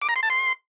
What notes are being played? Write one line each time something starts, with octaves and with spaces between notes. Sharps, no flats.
D6
A#5
C6
A5
C6